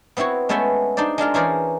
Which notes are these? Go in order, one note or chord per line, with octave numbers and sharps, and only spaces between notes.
B3 C4 E4 F#4 C#5
G#3 A3 B3 C#4 E5 G5
D4 D#4 C5 D5
G#3 D4 F4 A#4
E3 C#4 G#4 A#4 C5 D5